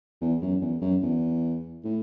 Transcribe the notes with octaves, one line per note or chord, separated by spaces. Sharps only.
E2
F#2
E2
F#2
E2
A2